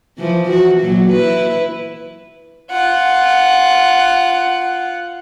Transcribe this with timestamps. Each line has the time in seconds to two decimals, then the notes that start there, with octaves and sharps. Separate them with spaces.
0.18 E3 F3
0.50 F#4
0.80 A#2 F#3
1.12 E4 B4
2.71 F4 F#5